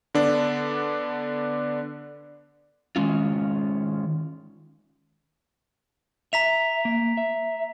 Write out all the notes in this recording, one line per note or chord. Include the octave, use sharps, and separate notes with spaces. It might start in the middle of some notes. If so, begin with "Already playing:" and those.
D3 B3 D4
D#3 G#3 C#4 F4
E5 A#5 B6 F7
A#3
E5